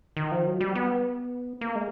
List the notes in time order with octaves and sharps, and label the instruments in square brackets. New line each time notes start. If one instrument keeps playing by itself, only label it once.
[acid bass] D#3
F3
F#3
G3
B3
A#3
G#3